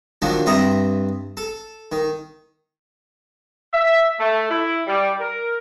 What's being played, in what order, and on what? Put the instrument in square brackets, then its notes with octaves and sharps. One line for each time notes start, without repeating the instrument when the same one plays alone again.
[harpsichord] D#3 F3 F#3 D4
G2 C4 D#5 E5 A#5
A4
D#3
[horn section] E5
A3
E4
G3
A#4